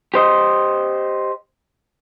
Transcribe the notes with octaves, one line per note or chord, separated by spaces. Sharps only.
G4 C5 D#5